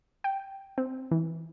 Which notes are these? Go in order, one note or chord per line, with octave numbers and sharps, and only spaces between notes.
G5
C4
E3